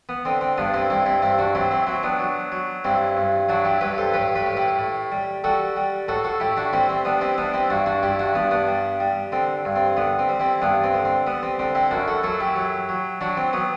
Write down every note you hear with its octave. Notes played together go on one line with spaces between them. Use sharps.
B3
D3 C4
C4
G2 B3 D4
C4 E4
G2 C4 E4
C4 E4
G2 C4 E4
D4 F#4
F#3 C4 E4
C4 E4
F#3 C4
B3 D4
F#3
F#3
G2 C4 E4
G2
F#3 D4 F#4
E4 G4
G2 G4 B4
A4 C5
A2 G4 B4
G4 B4
A2
E4 G4
A2
G3
G3 F#4 A4
G3
A2 F#4 A4
F#4 A4
A2 E4 G4
D4 F#4
G3 C4 E4
C4
G3 B3 D4
C4 E4
G3 B3 D4
C4 E4
G2 D4 F#4
D4 F#4
G2 E4 G4
D4 F#4
G2 B3 D4
B3 D4
G3
G3
D3 C4
G2
C4
D3 B3
C4
G3
C4 E4
G2 B3 D4
C4
D3
C4
G3 B3
C4
D3 C4
C4 E4
F#2 D4 F#4
F#4 A4
F#3 F#4 A4
E4 G4
F#3
F#3
F#3 D4 F#4
C4
F#3 B3